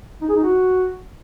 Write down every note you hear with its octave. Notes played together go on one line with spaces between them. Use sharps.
D#4
G#4
D#4
F#4